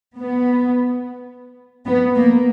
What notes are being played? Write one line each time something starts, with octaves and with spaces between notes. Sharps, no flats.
B3
B3
A#3